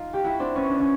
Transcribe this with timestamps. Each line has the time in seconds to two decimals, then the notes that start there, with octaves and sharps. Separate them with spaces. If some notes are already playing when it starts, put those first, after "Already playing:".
Already playing: D#4 F4
0.13 G4
0.24 E4 F#4
0.39 C4 D4
0.55 B3 C#4
0.69 D4
0.79 C#4